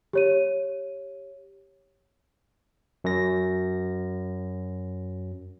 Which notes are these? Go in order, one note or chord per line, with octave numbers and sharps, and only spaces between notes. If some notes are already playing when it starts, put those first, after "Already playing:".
G4 C#5 D#7
F#2 A#6